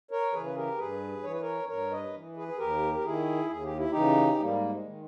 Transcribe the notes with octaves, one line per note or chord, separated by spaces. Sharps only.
A#4 C#5
C#3 E3 G#4 B4
B4
G4 A#4
G2 G#4 B4
E3 C#5
B4
A#4 C#5
G2 A#4 C#5
B4 D#5
E3
G#4 B4
G#4
D#2 G4 A#4
A#4
D#3 E4 G#4
D#2 G#4
G4
E4
C#3 E3 D#4 G4
G#2 G3 A#3
G#3
D#3